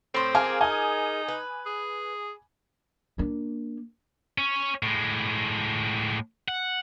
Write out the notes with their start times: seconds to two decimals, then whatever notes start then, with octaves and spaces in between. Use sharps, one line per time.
0.14 A2 C4 C5
0.35 G#4 A#4 F5 G#5 D6
0.61 D#4 G#5 D#6
1.28 B4
1.66 G#4
3.18 A#3 D4
4.38 C#4
4.83 A2 G#3
6.48 F#5